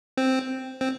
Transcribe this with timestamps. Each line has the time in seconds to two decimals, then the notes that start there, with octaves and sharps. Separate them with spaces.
0.17 C4
0.81 C4